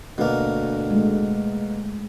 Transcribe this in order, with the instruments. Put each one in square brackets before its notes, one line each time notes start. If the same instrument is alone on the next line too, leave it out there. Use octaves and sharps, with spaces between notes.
[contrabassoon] D2 [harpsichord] B2 A#3
[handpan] G#3 A3